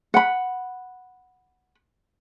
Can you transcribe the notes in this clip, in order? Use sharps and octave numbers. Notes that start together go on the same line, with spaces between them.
F#5 B5